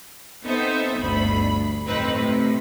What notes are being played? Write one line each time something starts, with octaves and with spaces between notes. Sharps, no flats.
B3 C4 D#4 A4 C5 E5
G1 D2 B5
F2 A2 C4 D#4 B4
A2 C3